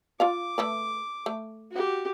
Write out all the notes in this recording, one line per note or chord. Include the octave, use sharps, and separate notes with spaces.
F4 D5 F5 D6
A3 A4 B4
A3
F#4 G4